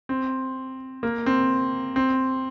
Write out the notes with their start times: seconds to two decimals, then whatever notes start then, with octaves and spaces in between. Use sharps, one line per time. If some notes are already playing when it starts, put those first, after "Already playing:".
0.09 C4
1.03 A#3
1.26 C4
1.96 C4